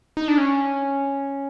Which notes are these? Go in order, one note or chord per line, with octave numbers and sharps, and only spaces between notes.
D#4
D4
C#4